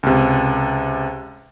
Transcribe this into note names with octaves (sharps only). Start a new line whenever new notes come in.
C#2 C3